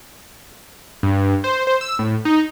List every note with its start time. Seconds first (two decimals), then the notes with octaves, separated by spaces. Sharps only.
1.03 G2
1.44 C5
1.67 C5
1.81 E6
1.99 A2
2.25 D#4